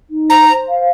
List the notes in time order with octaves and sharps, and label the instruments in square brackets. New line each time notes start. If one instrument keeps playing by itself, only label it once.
[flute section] D#4
[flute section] C5 [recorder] A#5
[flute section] C5
F5